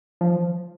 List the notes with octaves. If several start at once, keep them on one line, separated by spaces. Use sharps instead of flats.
F3